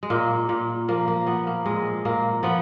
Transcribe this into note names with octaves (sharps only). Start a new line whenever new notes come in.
G#3
A#2 A#3
A#2
F3 A#3
A#3
F3 B3
A#3
A#2 G#3
A#2 A#3
F3 B3